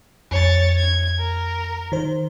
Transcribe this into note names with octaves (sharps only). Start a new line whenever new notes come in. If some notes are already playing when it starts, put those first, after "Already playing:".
F2 C#5 A6
G#6
A#4
D#3 C5